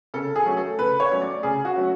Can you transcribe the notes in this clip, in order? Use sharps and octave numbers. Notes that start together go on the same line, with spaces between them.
C#3 A4
G#4
F#3 A3 C#4
A4
C#3 B4
C#5
F#3 A3 C#4
D5
C#3 G#4
F#4
F#3 A3 C#4